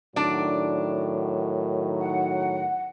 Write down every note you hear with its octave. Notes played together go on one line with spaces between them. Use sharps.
A2 D#3 F#3 D4 D5
F#5